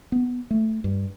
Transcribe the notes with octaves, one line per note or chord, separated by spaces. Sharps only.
B3
A3
G2